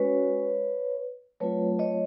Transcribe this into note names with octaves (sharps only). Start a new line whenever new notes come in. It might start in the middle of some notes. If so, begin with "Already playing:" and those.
Already playing: G#3 C#4 F#4 B4 C#5
F#3 A3 C4 F4 B4 C#5
C#5 D#5